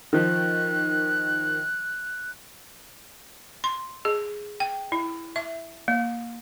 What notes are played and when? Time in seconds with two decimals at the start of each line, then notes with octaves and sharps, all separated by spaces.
0.13 D#3 F3 F#6
3.64 C6
4.05 G#4
4.60 G5
4.92 E4
5.36 E5
5.88 A#3